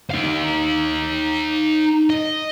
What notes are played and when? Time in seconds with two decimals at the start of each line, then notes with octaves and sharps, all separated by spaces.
0.10 D#4 F5
2.10 D#5